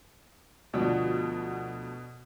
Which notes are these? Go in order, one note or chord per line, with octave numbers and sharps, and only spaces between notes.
D2 B2 F3 D5